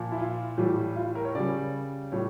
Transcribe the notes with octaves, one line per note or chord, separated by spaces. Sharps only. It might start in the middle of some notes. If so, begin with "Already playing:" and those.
Already playing: A#2 F3
E4
F4
A2 E3 G3
F4
A#4
C#5
C#3 G3 D5
A2 G3 C#5